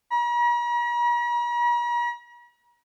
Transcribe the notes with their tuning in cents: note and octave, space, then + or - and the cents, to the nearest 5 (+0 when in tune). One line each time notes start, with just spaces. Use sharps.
A#5 +45